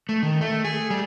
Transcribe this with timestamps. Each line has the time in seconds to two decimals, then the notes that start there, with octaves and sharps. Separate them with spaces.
0.09 A3
0.23 D#3
0.41 A3
0.65 G#4
0.90 G3